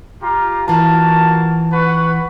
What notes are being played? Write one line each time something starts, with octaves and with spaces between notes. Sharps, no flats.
F4 G4 A#5
E3 A#3 F4 F#4 A5
B4 F#5 C#6